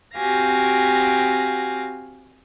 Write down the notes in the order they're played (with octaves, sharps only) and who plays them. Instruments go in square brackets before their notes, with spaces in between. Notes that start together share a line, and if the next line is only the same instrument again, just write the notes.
[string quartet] C4 F#4 G4 F5 G#5 A#6